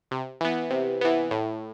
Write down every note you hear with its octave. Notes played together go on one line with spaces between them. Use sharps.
C3
E3 B3
C3
E3 B3
A2